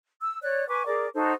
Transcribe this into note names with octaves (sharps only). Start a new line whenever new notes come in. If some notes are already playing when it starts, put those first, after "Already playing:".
E6
C#5 D5 F#6
B4 G#5 C#6 D6
G#4 A#4 D5 D6
D#4 F#4 A4 C5